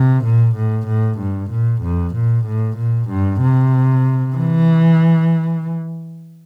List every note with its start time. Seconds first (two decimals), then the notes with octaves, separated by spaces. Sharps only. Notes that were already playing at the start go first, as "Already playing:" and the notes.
Already playing: C3
0.25 A#2
0.56 A2
0.87 A2
1.19 G2
1.51 A#2
1.82 F2
2.15 A#2
2.46 A2
2.77 A#2
3.09 G2
3.41 C3
4.36 E3